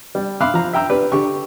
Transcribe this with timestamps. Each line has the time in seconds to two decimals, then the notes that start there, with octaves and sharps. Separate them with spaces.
0.15 G3
0.41 E5 F5 B5 C6 D6 F#6
0.54 F3 A#5
0.73 E5 G5 A#5 E6
0.90 D4 G4 B4
1.12 D3 G4 C#6